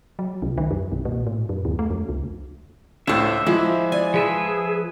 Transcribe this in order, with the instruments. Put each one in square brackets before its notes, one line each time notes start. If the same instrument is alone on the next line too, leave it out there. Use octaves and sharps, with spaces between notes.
[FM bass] F#3
C2
D#3
F#2
B1
A#2
A2
F#2
D#2
A3
F2
C#2
[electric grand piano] C#2 A2 [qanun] D4 C5 [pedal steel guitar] E5
[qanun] F3 [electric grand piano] G#3 E4
[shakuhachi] D5 [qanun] G#5
[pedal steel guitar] F3 B4 E5 [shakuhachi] G#4